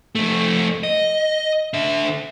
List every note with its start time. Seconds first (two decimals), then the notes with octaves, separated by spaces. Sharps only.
0.15 F2 A3
0.83 D#5
1.74 D3 E5